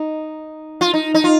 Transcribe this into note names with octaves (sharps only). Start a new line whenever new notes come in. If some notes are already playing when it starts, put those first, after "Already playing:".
Already playing: D#4
F4
D#4
D#4
F4